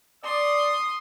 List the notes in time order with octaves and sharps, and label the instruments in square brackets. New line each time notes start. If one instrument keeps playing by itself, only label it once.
[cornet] D5 [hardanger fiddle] C6 [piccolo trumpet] D#6